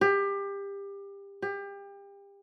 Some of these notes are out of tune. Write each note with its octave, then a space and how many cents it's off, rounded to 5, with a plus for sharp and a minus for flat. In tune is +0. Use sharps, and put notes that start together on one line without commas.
G4 +25
G4 +30